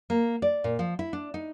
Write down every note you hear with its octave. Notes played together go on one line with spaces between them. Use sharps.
A#3
D5
A#2
F3
E4
D4
D#4